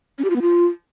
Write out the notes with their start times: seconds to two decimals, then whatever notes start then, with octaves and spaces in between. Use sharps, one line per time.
0.19 C#4
0.24 G4
0.30 F4
0.36 B3
0.42 F4